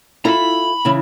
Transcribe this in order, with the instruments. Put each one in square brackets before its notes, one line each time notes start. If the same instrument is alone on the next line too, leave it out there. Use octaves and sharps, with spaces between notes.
[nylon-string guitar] E4 F4 A4 [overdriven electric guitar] A#5 B5
[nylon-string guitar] C#3 E3 E4